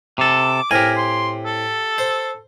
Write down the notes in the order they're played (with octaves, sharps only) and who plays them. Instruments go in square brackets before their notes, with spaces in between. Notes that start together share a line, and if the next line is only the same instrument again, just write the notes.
[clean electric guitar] C3 A4 [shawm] D6
[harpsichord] A2 C4 [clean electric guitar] G4 G#5 [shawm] A#4
[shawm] C6
A4
[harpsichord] C5